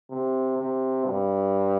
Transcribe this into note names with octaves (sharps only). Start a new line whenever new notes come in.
C3
C3
G2